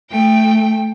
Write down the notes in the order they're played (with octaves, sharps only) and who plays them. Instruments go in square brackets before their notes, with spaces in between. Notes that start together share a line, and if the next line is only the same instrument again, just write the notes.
[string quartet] A3 G5